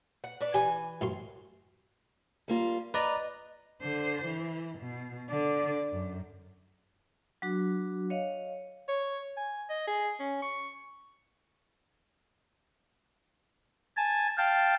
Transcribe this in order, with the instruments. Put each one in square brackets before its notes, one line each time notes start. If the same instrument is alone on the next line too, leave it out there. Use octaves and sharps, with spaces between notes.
[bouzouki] F#5
D4 B4 D5
[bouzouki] E3 G#5 [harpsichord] G4
[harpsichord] A1 F#2 C6
[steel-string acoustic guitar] G3 A#3 F4
[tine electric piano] B4 D5 A#5 [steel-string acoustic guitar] D#5
[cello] D3 C5
E3
B2
D3 D5
F#2
[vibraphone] F#3 D4 F#4
C#5 D#5 F5
[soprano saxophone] C#5
G#5
D#5
G#4
C#4
C#6
[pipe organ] G#5 A5
F5 G5 A5